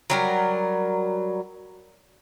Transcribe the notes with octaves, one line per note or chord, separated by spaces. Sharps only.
F#3 G3 A#4